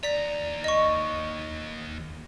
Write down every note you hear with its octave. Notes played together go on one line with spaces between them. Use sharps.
D#2 D5 A#5 B6
D#5 C#6